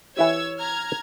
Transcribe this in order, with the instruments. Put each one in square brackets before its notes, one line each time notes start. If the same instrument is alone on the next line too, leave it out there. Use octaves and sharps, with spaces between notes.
[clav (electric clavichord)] E3 E4 G4 [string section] C#5 E6 G#6
[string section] A#5 F6 G#6